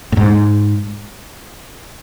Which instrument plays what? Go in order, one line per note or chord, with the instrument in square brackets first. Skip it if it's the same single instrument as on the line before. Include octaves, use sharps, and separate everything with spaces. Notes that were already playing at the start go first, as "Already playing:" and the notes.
[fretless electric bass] A2
G#2